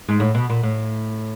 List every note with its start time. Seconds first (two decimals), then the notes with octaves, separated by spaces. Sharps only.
0.08 G#2
0.20 A2
0.35 B2
0.50 A#2
0.63 A2